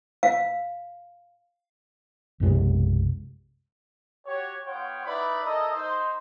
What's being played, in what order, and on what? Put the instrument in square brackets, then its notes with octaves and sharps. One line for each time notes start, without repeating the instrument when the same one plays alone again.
[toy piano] F5
[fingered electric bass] B1 F#2 C3 G#3
[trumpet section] F#4 G4 C#5
B3 F4 C#5 F#5 G5
D#4 E4 B4 D5 B5
E4 A4 A#4 D#5
D#4 C5